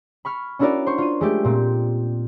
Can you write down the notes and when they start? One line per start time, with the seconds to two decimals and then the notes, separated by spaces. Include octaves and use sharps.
0.25 B5 C#6 F6
0.59 C#4 D4 E4 F#4 A#4 D5
0.86 C5 C6 C#6
0.98 F4 D#7
1.21 G#3 A3 G4
1.45 A#2 C4